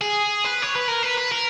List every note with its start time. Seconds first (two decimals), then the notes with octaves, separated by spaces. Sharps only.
0.01 G#4
0.45 B4
0.62 C#5
0.76 B4
0.88 A#4
1.03 B4
1.18 B4
1.32 A#4